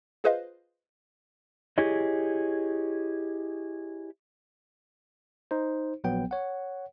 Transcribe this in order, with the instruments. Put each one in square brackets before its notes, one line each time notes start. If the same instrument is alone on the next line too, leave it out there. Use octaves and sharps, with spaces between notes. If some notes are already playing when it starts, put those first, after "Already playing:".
[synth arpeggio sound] F4 G#4 B4 C5 D#5 F5
[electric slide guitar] E4 G4 G#4 C#5 D#5
[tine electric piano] D#4 C5
A#1 F#3 B3 G5
C#5 F#5